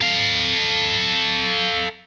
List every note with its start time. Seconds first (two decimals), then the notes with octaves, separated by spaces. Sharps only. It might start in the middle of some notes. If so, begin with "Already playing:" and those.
0.01 A4 F5